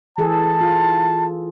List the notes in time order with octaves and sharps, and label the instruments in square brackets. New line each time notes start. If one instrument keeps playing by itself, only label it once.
[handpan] E3 G#4 A4 [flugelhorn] A5
[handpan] F4